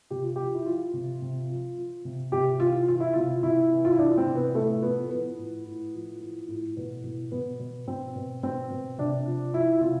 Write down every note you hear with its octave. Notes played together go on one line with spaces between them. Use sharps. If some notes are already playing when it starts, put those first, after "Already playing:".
C3 G4
F4
F3 G4
E4
F3 F4
C3
C3
F3
F3
C3
C3 G4
E3 F4
E3 F4
E4
C3 F4
C3 E4
E3
F4
E4
E3 D4
C4
C3
B3
B3
A2 A3
F3 B3
F3 B3
A2
A2
F3
F3
A2
B2 B3
B2
B2 B3
B2
B2 C4
B2
B2 C4
B2
C3 D4
F3
F3 E4
C3 F4